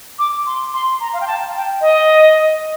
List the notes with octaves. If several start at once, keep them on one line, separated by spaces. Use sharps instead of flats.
D6
C6
C6
A#5
F5
G5
A5
G5
D#5